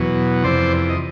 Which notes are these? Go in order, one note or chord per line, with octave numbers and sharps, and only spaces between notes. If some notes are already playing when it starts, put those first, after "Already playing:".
Already playing: E2 B2 F#3
F2 C3 E3 C5 D5
D#5